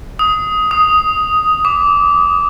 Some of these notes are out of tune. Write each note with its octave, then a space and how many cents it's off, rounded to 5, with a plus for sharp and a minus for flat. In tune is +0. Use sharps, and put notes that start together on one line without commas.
D#6 +15
D#6 +5
D6 -20